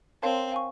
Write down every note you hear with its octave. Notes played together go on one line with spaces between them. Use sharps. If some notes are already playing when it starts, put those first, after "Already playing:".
C4 A#4 C#5 F5 A5 C6
F5 G#5 C#6